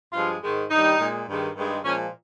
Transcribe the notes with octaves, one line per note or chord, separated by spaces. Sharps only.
G2 F3 G#3 F4
G#2 D#3 G#3
G2 D#3 G3 D#4
A#2 G#3
G2 D#3 G#3
G2 D#3 G#3
A#2 F3 G#3 C#4